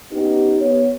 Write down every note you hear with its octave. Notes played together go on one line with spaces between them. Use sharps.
B3 C#4 D#4 G4
B3 C#5